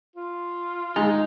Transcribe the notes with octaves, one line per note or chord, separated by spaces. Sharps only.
F4
G#3 D#4